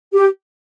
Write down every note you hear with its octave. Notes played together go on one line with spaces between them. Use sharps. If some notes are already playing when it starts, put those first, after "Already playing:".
G4